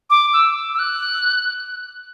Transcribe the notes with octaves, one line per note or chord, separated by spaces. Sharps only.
D6
E6
E6
F#6